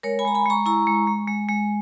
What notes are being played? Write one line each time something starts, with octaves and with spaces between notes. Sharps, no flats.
G#3 A#4 C#5
G#5 B5
G#3 A#5
G#5 B5
G#3 A#5 C#6
E4 A#5 C#6
G#3
G#3
G#3
G#3